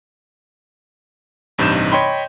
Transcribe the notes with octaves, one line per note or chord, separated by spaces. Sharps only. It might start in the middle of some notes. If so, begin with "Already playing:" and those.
A1 G2 C3 D#4 G6 E7
C#5 D#5 G5 B5 C6